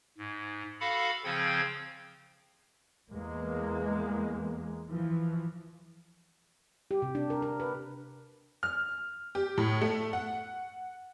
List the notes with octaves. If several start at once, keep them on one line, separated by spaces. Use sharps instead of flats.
G#2
F#4 A4 F5 F#5 B5
C#3 F3 C4 G5 G#6
E2 G#3 A#3
E3 F3
G4
C3
D4
A#4
A#4
B4
F6
G4
A2
A3
F#5